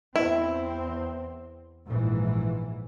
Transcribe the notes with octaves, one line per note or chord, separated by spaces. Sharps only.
E2 C4 E4
A#1 G#2 E3